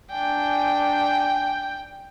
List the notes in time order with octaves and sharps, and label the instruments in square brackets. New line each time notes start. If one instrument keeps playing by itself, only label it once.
[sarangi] D4 [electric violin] G5 [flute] G#5